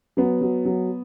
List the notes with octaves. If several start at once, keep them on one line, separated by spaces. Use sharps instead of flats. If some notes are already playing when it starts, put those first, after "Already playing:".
F#3 B3
F#3
F#3